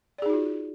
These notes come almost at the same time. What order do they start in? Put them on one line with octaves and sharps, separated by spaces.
D5 G#4 D#4 F#4 F4